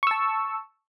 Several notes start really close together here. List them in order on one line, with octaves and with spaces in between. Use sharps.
C#6 E6 A5